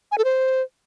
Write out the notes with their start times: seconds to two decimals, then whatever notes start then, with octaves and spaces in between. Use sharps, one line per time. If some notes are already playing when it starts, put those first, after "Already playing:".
0.12 G#5
0.18 A4
0.25 C5